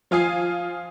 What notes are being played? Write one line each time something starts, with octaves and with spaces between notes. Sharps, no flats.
F3 F4 F5 G#5 D#6 C7